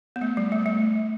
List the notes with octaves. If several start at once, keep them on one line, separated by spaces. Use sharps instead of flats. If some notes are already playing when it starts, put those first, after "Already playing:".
B3
A3
G3
A3
A3